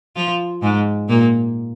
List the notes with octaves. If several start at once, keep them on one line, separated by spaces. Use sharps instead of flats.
F3 F4
G#2 G#3
A#2 A#3